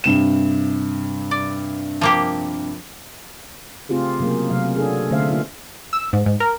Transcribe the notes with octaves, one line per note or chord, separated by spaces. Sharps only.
G2 C3 E7
D5
F3 A#3 G4
C#3 A3 C4 F4 G4 G#4
C3 F#3 A#3 C#4 G#4
C3 F#3 A3 F5
D4 F#4 G#4 A4
D3 A3 C#4 C5 E5 F5
A#3 D#4 F4
E6
G#2
G#2
A#4